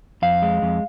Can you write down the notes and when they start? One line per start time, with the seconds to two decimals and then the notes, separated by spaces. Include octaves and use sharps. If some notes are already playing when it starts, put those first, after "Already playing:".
0.22 F2 F5
0.42 G#3
0.62 F2